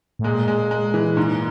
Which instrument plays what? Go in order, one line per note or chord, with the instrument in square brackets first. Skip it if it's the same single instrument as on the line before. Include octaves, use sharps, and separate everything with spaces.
[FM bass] A2
[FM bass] A#2 [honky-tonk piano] G#3
[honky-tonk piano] G#3
G#3
E3
G#2